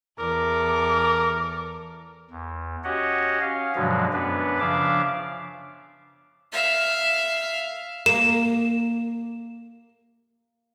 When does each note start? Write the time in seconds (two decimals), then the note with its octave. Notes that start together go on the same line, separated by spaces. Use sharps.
0.19 E2 A4 A#4 D6
2.30 E2
2.84 C#4 F#4 G4 C#5 D#5 F#5
3.41 C#4 F5
3.75 G2 B2 D3 F3 F#3 G#3
4.13 F#2 B3 C#4 D4 B4
4.60 C#3 F3 D4 E5 F5 D6
6.52 E5 F5
8.06 A#3 E7